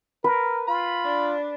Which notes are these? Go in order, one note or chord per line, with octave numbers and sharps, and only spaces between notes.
A#4 B4
F4 B5
D4